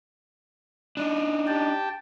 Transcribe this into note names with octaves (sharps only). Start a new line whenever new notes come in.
D4 D#4
G4 G5 A5